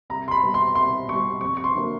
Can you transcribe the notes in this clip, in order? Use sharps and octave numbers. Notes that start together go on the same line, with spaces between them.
C2 A#5
C6
B5
B2 G3
C6
C2 C6
B2 G3 C#6
F2 C#6
C#6
C6
D3 F#3 A#3